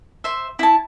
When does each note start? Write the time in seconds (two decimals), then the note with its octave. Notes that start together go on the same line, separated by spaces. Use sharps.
0.24 C5 E5
0.59 E4 A5